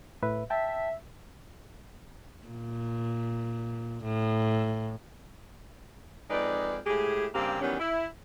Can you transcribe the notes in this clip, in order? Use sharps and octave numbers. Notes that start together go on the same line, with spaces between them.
A2 B4 E5
E5 G5 A5
A#2
A2
F2 G#3 D#4 B4 D5
A2 G#3 G4 G#4
G2 C#3 A#3 C4 G4
D#3 E3 F#3 G3 B3 C#4
E4